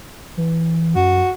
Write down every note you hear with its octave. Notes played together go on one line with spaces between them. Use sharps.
E3
F#2 F#4